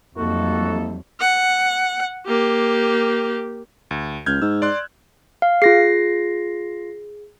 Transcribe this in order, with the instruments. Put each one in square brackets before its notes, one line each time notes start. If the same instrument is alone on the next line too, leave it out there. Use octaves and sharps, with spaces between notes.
[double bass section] F2 F#3 G3 [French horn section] C3 D#4 A4 [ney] A#3 [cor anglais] F#4
[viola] F#5
A#3 G4
[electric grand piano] D2
[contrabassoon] C#2 [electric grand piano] F6 G6 G#6
[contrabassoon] G#2 [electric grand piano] E6
[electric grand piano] D5 C6 F#6
[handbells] F5
[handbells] F4 A#6 C7 [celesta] G#4